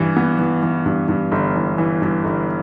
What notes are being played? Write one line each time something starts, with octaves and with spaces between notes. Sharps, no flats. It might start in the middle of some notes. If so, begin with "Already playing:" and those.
Already playing: G2 E3
B3
E3
E3
G2
G2
G1
E3
E3
G2
G1